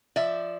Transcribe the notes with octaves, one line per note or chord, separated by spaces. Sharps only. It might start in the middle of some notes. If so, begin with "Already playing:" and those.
F3 D5 E5